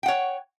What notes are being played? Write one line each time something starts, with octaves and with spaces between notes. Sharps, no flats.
C#5 F#5 G5